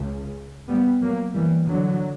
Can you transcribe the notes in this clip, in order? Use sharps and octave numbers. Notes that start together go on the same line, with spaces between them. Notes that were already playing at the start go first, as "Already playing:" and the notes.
Already playing: C#2 C#3
G3 B3
F#3 A#3
E3 G3
D3 F#3